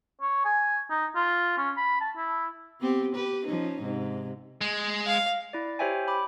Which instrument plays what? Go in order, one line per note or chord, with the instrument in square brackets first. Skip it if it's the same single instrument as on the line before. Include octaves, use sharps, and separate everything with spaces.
[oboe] C#5
G#5
D#4
F4
C#4
B5
A5
E4
[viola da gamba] B3 C4 G4
G4 B4
F3 C#4 D#4
G#2 C3
[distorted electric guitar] G#3
[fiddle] F5
[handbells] E4 D5
G4 C5 C#5 E5 G5 G#5
B5 D6